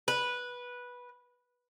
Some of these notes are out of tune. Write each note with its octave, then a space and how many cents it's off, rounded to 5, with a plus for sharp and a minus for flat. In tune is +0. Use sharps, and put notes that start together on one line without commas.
B4 -10